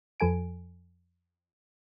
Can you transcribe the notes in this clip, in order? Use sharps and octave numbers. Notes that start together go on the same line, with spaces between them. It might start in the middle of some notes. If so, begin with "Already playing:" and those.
F2 F3 A4 G#5 D7